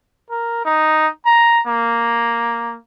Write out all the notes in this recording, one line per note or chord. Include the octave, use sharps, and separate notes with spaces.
A#4
D#4
A#5
A#3